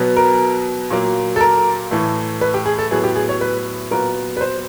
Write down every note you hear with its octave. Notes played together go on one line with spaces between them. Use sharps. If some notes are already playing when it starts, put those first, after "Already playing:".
Already playing: B2 F#3 B3
A#4
A#2 F#3 A#3
A4
A#4
A2 E3 A3
B4
G4
G#4
A4
A2 F#3 B3 G#4
G4
G#4
C#5
B4
A#2 F#3 B3 A#4
B4
C5